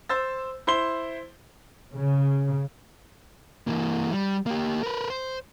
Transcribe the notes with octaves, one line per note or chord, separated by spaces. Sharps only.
C5 E6 A6
E4 C5 C6 G7
C#3
E3 A#3
G3
A#3 G4
A#4 B4
C5